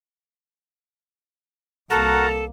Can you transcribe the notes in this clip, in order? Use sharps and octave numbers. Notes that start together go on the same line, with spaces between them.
C2 A#3 F#4 A4 A#4 F#5 A5 A#5